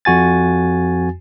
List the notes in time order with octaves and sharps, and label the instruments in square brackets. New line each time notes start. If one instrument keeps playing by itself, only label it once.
[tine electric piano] F2 F#4 G#5 A6